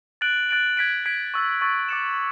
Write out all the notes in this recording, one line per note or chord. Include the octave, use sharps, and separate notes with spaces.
F#6 A6 D7 F#7
F#6 A6 D7 F#7
G#6 B6 D7
G#6 B6 D7
C#6 E6 A6
C#6 E6 A6
D6 A6 C#7 E7